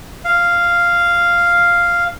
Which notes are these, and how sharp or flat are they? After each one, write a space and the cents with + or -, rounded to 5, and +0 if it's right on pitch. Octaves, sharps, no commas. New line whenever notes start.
F5 -5